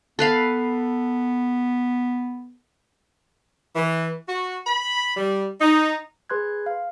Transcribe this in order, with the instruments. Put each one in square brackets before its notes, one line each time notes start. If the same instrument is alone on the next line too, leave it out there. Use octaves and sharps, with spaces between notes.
[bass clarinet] B3 [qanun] A4 B4 F5
[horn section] E3
F#4
B5
G3
D#4
[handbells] G#4 B4 C6 F#6 G#6
F5